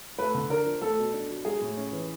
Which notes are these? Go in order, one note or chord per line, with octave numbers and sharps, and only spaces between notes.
A3 B4
D3
D4 A#4
F3
A3 A4
B2
D4
F#3
G#3 G#4
A2
C#4
E3